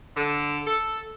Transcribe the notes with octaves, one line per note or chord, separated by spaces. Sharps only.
D3
A4